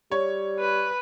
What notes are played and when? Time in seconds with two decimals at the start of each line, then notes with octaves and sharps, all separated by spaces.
0.11 G3 C#5
0.59 B4